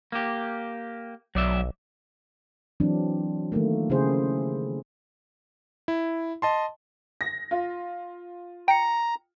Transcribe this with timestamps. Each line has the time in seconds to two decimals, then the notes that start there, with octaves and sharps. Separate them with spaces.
0.12 A#3 G4
1.35 B1 F#3 D5 E5
2.80 E3 F#3 C4 D4
3.52 D#3 F3 A3 A#3
3.90 C#3 E4 G4 G#4 C5
5.88 E4
6.42 D#5 A5 C6
7.21 A#6
7.51 F4
8.68 G5 A#5 C#7